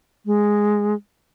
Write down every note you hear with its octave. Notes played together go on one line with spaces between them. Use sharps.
G#3